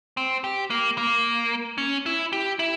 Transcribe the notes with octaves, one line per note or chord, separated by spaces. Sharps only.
C4
G4
A#3
A#3
C#4
E4
G4
E4